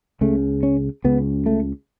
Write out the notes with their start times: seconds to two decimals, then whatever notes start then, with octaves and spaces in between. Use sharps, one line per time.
0.21 C#2 C#3 A3
0.63 C#4
1.04 C#2 C#3 B3
1.46 A3